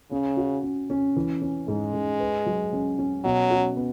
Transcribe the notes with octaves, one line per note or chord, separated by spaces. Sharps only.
C#3 C#4
F#4
C#4
C#4
E3
C#4
G#2 G#3
G#2
B4
F#3
C#4
C#4
B2 F#3
F#4
B3